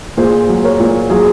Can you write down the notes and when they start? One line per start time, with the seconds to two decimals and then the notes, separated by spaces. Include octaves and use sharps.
0.17 A#2 G#4 C5
0.49 F#3
0.64 A#4 C#5
0.79 A#2
1.10 F#3 F4 G#4